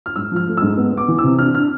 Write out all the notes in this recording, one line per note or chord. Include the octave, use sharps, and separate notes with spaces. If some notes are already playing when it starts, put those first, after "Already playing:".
F6
G#2 E6
F3 F6
A3
G#2 E6
B3
B3
D6
E3
E6
C3
D4 F6
D4 F6